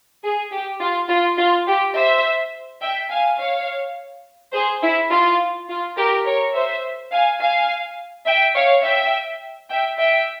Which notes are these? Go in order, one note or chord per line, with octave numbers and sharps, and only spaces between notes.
G#4
G4
F4
F4
F4
G4
C5 E5
E5 G5
F5 G#5
C#5 F5
G#4 C5
E4
F4
F4
G4 A#4
A#4 C#5
C5 E5
F5 G#5
F5 G#5
E5 G5
C#5 F5
E5 G5
E5 G5
E5 G5